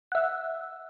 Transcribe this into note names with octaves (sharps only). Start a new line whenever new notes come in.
E5 F#5